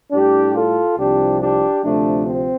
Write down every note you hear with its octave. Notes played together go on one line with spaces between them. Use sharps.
A2 G3 D4 G4
F4 A4
C2 C3 F3 D4 G4
D4 G4
D2 C3 F3 A3 D4
C4